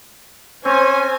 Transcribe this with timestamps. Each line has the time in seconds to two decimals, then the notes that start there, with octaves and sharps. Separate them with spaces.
0.65 C4 C#4 C5 G#5